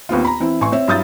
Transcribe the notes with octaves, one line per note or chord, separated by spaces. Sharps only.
D#2 B3 C4 F4
A#5 B5
E3 C4 E4
A1 G#5 C6 C#6
C4 C#5 E5
G2 F#3 E4 D#6 G6 A6